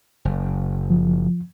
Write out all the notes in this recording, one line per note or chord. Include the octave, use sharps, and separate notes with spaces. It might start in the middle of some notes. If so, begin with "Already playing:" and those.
F#1
F3